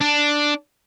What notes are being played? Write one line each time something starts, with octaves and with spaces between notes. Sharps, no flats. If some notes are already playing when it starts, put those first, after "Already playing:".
D4